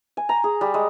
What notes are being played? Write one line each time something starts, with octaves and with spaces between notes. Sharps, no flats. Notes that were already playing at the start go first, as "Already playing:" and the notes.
G#5
A#5
G#4
G3
G#3